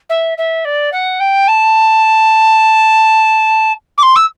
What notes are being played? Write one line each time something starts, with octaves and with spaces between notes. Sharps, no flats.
E5
E5
D5
F#5
G5
A5
D6
C6
E6